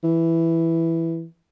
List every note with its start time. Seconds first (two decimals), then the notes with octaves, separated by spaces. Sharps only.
0.04 E3